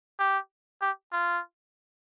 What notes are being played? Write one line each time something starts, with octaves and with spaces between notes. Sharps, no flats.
G4
G4
F4